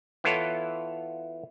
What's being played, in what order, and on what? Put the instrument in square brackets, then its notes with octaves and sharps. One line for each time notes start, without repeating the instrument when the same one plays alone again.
[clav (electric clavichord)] E3 B3 E4 F4 A4 C#5